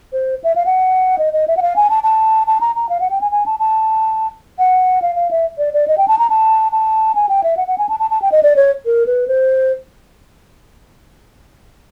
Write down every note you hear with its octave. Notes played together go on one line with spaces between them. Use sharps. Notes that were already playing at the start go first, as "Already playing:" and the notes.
C5
E5
F5
F#5
D#5
D#5
E5
F#5
F5
G#5
A5
A5
A5
A#5
A#5
F5
F#5
G5
G#5
G#5
A5
A5
F#5
F5
F5
E5
D5
D5
D#5
G5
A5
A#5
A5
A5
G#5
G5
E5
F#5
F#5
G#5
A5
A5
A5
G5
D#5
D5
C#5
A#4
B4
C5